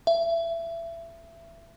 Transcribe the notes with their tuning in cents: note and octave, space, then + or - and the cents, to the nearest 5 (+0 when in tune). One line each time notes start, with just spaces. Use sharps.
E5 +25